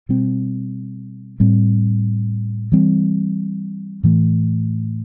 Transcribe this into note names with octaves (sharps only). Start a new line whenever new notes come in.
B2 G3 C4
A2 G3 C4
E3 G3 C4
A2 E3 A3